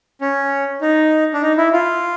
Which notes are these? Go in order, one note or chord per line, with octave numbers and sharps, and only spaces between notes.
C#4
D#4
D4
D#4
E4
F4